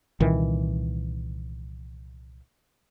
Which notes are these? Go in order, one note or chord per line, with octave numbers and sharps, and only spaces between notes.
C2 A#2 D#3 E3